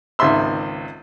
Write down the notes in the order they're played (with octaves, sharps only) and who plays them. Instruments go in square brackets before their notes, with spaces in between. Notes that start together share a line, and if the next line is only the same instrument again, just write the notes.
[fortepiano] G#1 C#2 E5 C6 E6